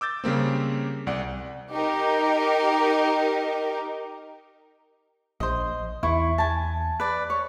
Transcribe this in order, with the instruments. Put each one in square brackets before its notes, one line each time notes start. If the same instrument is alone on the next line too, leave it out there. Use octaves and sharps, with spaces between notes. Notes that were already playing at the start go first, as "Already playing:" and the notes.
[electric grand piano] D6 E6 G6 A6
C#3 G3 A#3 C4
C2 D5 F#5
[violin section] D#4 G4 A#4
[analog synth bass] A#1 [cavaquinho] C5 D#5
[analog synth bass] E2 [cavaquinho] E4 C#6
[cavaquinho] G#5 A5
B4 D5
C#5